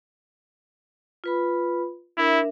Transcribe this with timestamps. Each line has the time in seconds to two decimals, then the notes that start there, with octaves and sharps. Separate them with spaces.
1.24 F4 B4 B5
2.18 D4 E4 A#4 E5